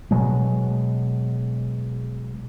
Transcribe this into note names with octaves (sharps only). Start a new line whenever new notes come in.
B2 F#3 G#3